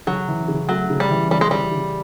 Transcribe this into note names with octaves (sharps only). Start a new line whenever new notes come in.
C#3 F#3
E3
C#3
F#3 A3
C#3
G3
E3
C#3 G3
G#3
E3 G3
C#3